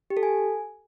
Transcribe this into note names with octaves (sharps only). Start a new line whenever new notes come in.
G4
A4
G#5